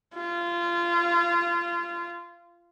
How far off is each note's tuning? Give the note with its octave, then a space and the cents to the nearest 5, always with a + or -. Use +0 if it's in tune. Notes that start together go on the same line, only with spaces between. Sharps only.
F4 -25